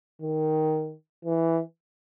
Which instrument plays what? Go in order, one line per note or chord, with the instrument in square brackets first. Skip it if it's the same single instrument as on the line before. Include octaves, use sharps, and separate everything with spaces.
[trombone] D#3
E3